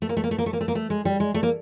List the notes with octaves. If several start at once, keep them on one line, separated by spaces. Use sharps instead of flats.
A3
A#3
A3
A#3
A3
A#3
A3
A#3
A3
A#3
A3
G#3
G3
G#3
A3
A#3